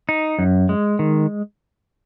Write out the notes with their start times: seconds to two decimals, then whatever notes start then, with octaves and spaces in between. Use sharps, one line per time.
0.09 D#4
0.39 F#2
0.69 G#3
0.99 D#3